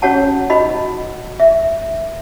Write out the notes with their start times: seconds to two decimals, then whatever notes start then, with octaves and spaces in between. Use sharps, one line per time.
0.02 C#4 F#4 C#5 F#5 A5
0.50 D#4 F#4 D#5 B5
1.40 E5